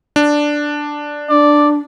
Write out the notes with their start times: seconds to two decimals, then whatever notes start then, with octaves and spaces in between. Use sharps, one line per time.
0.16 D4
1.29 D4 D5